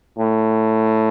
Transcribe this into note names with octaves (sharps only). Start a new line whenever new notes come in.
A2